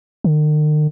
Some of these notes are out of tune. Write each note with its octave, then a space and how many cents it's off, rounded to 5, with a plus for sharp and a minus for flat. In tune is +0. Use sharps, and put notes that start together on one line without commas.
D#3 -45